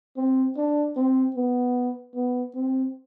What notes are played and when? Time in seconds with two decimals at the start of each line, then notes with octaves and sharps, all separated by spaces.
0.17 C4
0.57 D4
0.96 C4
1.36 B3
2.15 B3
2.55 C4